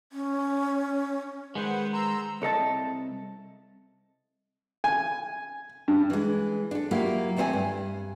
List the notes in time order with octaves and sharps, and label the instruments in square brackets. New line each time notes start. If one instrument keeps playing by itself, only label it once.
[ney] C#4
[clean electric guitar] D#3 G#3 [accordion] B4 C5 F#5
[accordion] A#5 C6 E6
[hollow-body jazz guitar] C2 A4 D#5 A5
[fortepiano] G#5
G2
[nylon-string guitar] E3 G#3
D4 A4
F#3 A#3 E4 F4 G4
D#2 A3 C4 C#5 D5 G#5
G2